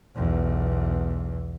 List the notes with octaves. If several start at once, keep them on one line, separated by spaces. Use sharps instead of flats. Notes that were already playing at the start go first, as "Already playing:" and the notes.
B1 E2